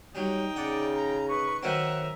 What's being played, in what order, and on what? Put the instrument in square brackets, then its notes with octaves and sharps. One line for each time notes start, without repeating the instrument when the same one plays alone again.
[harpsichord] F#3 G3 [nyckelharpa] D#4 G5
[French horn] C#3 [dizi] D5 [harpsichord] F#5
[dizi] A#5
[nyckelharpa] D#4 B4 [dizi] C#6
[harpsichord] D#3 F#3 C4 [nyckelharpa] A#4 E5 [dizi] F#5